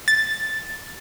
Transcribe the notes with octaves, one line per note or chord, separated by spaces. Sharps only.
A6